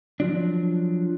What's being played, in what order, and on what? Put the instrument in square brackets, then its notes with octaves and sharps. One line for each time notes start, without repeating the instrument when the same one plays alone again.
[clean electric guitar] F3 F#3 D4